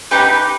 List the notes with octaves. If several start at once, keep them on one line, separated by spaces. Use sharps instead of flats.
B3 D#4 G4 B4